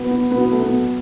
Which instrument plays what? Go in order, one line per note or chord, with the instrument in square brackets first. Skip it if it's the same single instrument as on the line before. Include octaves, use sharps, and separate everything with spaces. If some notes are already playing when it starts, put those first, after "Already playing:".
Already playing: [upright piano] B2 F#3 B3
B3
F#3 B3
B2
B3
A3
B3
B2 F#3